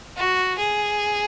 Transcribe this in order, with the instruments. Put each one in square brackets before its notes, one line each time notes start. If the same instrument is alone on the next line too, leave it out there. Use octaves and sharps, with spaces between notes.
[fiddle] F#4
G#4